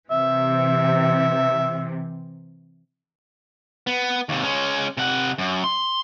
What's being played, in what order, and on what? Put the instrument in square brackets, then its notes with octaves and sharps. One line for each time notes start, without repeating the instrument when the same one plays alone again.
[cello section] C3 E3 [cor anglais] E5
[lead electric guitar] B3
D#2 C3
G#3 C#4
C3 F#5
F#2
C6